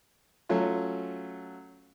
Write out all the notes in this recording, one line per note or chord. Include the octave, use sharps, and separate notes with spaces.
F#3 A3 C#4 F4